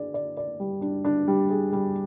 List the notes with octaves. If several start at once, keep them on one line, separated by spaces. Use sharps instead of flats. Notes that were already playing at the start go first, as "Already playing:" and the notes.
Already playing: D4 G#4 D5
D5
D5
G3
D4
D4
G3
G#4
G3